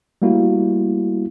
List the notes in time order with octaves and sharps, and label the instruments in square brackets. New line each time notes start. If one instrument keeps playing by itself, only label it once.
[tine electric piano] G3 A3 A#3 E4 F#4